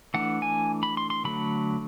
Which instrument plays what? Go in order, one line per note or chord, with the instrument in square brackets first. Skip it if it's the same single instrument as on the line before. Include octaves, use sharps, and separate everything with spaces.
[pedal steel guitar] E3 A3 D4 F#5
G#5
B5
C6
C6
D3 F#3 A3 B5